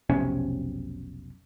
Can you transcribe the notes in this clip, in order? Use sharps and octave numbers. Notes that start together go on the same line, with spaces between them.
F1 B1 C3 C#4